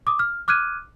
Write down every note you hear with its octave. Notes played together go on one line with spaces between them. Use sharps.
D6 D#6
F6
D6 F6 F#6 G#6 D#7